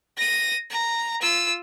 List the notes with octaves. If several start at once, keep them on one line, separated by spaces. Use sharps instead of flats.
A#6 D#7
A#5
F4 E6